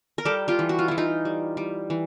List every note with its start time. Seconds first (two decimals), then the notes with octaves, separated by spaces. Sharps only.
0.18 A#4
0.25 G3 G4 A4
0.48 F4 G4
0.59 E3
0.69 F#4
0.79 F4
0.88 E3 E4
0.98 D#4 F4
1.25 G3
1.57 G3
1.90 E3